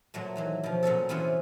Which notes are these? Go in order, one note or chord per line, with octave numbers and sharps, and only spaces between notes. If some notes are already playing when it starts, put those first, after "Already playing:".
A#2 F#3 A3
D#3 E3 F#3
B2 F3
A#2 F#3 C#4 A4
C3 E3 B3 C#4 F4